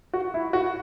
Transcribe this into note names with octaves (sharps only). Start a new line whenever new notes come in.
F#4
E4
F#4